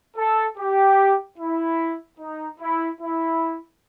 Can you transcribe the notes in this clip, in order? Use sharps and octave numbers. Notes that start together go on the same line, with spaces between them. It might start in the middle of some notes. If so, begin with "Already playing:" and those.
A4
G4
E4
D#4
E4
E4